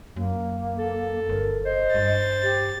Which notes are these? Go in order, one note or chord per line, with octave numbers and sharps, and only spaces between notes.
F#2 A#3
A4
G1 A#4
C5 D#5
G2 A6
G4